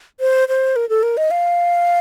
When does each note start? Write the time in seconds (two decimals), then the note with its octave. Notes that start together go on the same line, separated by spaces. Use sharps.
0.20 C5
0.48 C5
0.76 A#4
0.89 A4
1.03 A#4
1.17 D#5
1.31 F5